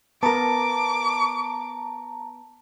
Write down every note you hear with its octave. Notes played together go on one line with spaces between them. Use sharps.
B3 A#4 A5 A#5 D6